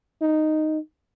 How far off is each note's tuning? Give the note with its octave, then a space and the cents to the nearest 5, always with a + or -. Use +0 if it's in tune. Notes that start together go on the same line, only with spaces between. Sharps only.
D#4 -5